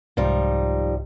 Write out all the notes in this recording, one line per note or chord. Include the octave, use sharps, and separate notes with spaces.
C2 G#2 F3 G3 D#4